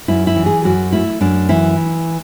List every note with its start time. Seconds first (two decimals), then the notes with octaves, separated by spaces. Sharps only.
0.08 F#2 E4
0.27 E4
0.36 E3
0.46 G#4
0.64 F#2 F#4
0.92 A3 E4
1.21 F#2 D4
1.49 E3 E4